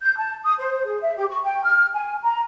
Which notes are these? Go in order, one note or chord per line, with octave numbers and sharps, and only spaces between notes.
G6
A5
D#6
C5
G#4
E5
G4
C#6
G5
F6
G#5
A#5